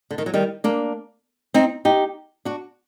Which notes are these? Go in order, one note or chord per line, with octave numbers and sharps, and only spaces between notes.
D3
D#3
F#3
D#3 G3
A#3 D4
C4 D#4
D#4 G4
D4 F#4